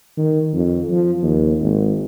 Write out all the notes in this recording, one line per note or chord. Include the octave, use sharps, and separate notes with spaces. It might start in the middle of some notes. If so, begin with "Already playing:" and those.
D#3
F2
F3
D#2
G#1